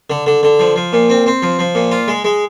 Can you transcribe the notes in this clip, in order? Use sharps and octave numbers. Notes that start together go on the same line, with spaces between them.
D3
D3
D3
F3
F3
A#2
C4
C4
F3
F3
A#2
F4
G#3
G#3